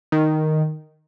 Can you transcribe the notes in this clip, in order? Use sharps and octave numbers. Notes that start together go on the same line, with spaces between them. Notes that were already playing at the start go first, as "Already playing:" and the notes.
D#3